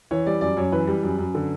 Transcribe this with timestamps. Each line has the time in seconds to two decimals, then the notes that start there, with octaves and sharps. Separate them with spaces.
0.11 E3 C#5
0.26 G3 D5
0.41 F#2 D5
0.57 F#2 C#5
0.72 E3 B4
0.87 G3
1.03 F#2
1.19 F#2
1.35 D3